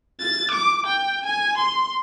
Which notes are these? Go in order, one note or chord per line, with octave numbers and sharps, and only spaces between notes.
A6
D6
G5
G#5
C6